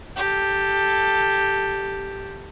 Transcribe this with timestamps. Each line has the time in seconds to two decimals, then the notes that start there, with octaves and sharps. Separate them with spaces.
0.16 G4 A4